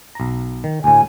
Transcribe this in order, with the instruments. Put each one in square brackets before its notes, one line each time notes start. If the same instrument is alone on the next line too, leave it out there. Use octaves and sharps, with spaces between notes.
[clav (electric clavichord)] B1 A#5
D#3
[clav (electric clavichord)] D2 A2 [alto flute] G#5